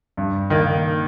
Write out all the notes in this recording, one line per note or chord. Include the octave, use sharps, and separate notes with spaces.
G2
D#3 A#3